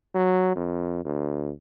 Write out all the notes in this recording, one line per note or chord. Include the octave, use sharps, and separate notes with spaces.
F#3
F2
D2